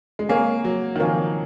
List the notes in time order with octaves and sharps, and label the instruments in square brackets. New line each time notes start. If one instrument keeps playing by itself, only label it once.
[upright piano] G#3
[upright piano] A#3 [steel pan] A#4 C#5 F5 G#5
[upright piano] F#3
D#3
[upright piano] F3 [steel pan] A#4 C#5 F5 G#5